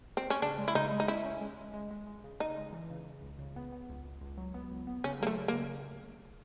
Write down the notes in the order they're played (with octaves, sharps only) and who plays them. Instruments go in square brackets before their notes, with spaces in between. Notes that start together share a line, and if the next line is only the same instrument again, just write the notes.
[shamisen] C4
C#4
[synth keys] C#3 [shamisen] D4
[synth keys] G#3
[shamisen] E4
[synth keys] C#3 [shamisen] D#4
[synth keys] G#3
[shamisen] D#4
[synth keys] C#4 [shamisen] E4
[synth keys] C#4
G#3
G#3
G#3
G#3
G#3
C#3
[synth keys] C#3 [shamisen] D#4
[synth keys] G#3
E3
C#3
C#3
C#2
C#3
B3
B3
C#2
C#2
C#2
F#3
B3
C#2
B3
[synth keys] C#3 [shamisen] C#4
[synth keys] F#3 [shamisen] A#3
[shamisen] A3
[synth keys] C#3
[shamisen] A#3
[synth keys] C#3